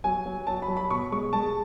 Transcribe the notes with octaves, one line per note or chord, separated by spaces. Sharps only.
F#3 G#5
F#3
F#3 A5
B5
F#3
B5
B2 C#6
G#3 C#6
G#3 A5